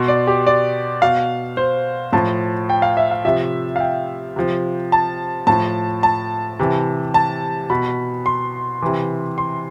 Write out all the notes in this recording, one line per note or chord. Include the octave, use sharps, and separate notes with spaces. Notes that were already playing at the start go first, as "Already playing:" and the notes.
Already playing: B2 C6
D5
G4
D5
B2 F5
C5
A2 F3 A5
G5
F5
E5
F5
C3 F3 E5
F5
G5
C3 F3
A5
A2 F3 A5
A5
C3 E3
A5
B2 B5
C6
C3 E3
C6